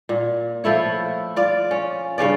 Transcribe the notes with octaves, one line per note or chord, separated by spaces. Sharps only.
A#2
F3 A3 E4 C#5
F4 D5
C#4
G2 C#3 C#4 D5